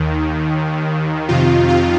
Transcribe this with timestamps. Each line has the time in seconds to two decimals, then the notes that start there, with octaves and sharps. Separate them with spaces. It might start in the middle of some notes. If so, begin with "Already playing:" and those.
Already playing: D#2 D#3
1.29 F2 C3 D#3 F4
1.69 F4